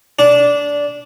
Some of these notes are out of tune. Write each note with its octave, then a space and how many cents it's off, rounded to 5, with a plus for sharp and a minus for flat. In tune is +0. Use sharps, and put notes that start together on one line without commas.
D4 -15